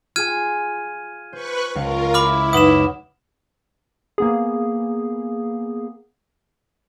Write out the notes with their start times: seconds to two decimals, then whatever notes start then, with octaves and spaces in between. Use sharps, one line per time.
0.16 F4 G#4 G#5 F6 G#6 D#7
1.33 B4 C5 C#6 F#6 C#7
1.75 C#2 F4 A#4 F5 C#6
2.14 E4 B5 D6 F6
2.53 F#2 D#4 B4 C#5 F#5 D#6 E7
4.18 A#3 B3 G#4